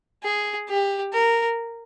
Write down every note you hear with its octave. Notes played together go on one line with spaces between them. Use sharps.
G#4
G4
A#4